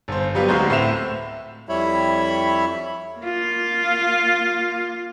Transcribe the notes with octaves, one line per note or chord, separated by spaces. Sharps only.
G1 C5
F#3 G3 B3 F4 G4
D2 G#3 C4 F#4 A#5 G6
A2 C5 E5 E7 F7
F2 G3 E4 C#5 E5 B5
A#3 F4